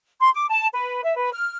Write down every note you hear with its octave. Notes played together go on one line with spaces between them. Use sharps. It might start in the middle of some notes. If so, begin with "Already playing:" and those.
C6
D6
A5
B4
E5
B4
F6